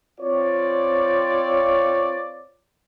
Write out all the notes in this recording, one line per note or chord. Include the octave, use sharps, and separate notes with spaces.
C4 F4 C#5 D5